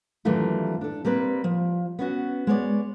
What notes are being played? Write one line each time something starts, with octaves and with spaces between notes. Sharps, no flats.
F#2 D#3 E3 G3 A3 F4
D4 A4
G3 A#3 C4 B4
F3
B3 C#4 F#4
G#3 B3 C#5 D5